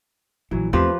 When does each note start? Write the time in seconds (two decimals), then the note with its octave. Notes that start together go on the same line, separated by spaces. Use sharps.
0.51 A#1 E3 F#3 E4
0.73 E2 F3 A3 C4 G4 B4